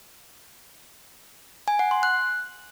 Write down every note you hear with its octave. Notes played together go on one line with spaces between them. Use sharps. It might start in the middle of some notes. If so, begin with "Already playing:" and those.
G#5
F#5
C6
F#6